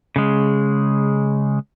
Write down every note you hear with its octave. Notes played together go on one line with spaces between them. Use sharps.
C#3 G#3